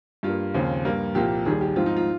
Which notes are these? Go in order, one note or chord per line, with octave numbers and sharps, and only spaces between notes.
G2 G3 A#3 F4
D#2 C#3 F3 C4
G2 G3 A#3
C2 A#2 F3 A#3 G4
D#2 D#3 G3 G#4
G4
G#2 F3 C4 F4
D#4
F4